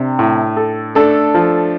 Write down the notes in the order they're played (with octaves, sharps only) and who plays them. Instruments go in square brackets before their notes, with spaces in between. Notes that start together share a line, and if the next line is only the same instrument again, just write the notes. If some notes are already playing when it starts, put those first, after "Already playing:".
Already playing: [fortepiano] C3 [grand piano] D4
[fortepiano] A2
A4
[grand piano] A3 D4 [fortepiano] A4
[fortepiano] F3